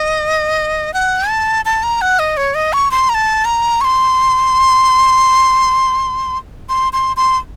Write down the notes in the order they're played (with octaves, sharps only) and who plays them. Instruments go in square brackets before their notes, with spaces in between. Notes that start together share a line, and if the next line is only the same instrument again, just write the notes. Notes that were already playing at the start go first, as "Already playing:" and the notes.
Already playing: [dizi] D#5
F#5
A5
A5
A#5
F#5
D#5
C#5
D#5
C#6
C6
A#5
A5
A#5
C#6
C6
C6
C6
C6